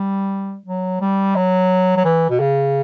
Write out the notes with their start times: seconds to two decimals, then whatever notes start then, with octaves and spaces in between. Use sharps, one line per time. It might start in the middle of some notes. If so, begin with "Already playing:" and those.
Already playing: G3
0.66 F#3
1.01 G3
1.36 F#3
1.97 F#3
2.05 E3
2.30 B2
2.40 C#3